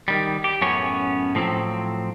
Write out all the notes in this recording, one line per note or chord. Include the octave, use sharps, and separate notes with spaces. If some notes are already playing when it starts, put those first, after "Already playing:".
D#3 G3
G4
F#2 A2 B3 C#4 C#5
A2 F3 F#3 C4